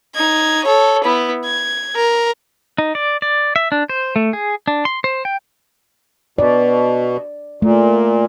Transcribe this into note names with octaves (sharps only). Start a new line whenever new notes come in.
D#4 G#6
A4 C#5
B3 E4
G#6
A#4
D#4
D5
D5
E5
D4
C5
A3
G#4
D4
C6
C5
G5
B2 D5
A#2 A3